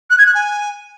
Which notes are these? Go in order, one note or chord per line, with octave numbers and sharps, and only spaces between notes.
F#6
G#6
F#6
G#5